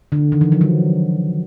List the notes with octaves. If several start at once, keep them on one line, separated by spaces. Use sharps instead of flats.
D3
D#3
E3
F3
F#3